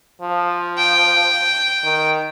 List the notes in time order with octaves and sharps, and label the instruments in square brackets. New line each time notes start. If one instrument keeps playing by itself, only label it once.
[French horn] F3
[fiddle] G5
[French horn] D#3